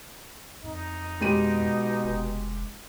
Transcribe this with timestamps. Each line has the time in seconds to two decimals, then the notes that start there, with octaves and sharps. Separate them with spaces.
0.64 F2 D#4
1.21 B2 G#3 G4 D#7
2.04 F1